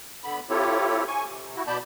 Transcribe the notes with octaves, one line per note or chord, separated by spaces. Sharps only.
D3 B3 B5
C4 E4 F4 G4 A4 C#5
G#5 C#6
C3
E4 F#4
B2 B3 D5 A5 B5 G6